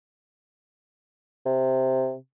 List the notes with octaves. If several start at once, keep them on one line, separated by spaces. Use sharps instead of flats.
C3